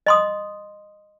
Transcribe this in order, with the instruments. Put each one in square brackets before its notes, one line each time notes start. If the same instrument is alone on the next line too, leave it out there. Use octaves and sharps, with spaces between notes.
[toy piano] D#5 C6 D#6